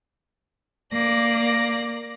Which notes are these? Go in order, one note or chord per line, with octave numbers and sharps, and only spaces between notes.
A#3 D5 A#6